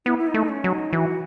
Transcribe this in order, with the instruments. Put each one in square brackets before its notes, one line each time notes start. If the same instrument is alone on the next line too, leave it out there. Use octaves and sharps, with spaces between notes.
[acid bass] B3 [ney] E4
[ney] E4
D#4
[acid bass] A3
[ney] C#4
[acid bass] F#3
[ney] D#4
[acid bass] E3 [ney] F#4